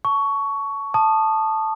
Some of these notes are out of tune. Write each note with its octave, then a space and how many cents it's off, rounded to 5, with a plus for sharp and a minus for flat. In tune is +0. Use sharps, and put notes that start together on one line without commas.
A5 +0 C#6 +15
A5 +0 D#6 -25